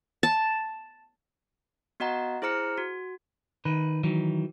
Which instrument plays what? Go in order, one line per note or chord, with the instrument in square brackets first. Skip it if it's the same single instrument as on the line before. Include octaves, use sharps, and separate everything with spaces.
[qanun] A5
[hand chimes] B3 F#4 D#5 F#5 A#5
E4 G#4 C5 A#5 F6 C#7
F#4
[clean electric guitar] D#3 B4
D#3 E3 F#3